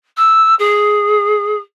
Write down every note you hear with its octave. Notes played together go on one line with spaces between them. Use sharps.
E6
G#4